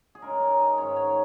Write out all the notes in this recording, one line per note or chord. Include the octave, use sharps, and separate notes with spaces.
G#4
C#3 G#3 D#4 A#4
A#4
D#5
G#2 D#3 G#3 C#4 C#5
C#5